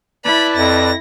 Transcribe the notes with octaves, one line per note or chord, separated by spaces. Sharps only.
E4 B4 D5 A5 B5
F2 A#6